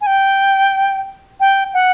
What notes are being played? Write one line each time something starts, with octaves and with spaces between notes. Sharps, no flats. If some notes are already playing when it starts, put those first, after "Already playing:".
G#5
G5
G5
F#5